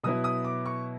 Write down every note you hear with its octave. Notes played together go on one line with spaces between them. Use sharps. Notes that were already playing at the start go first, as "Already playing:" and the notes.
B2 F#3 B3 E4 D#6
D#6
D6
C#6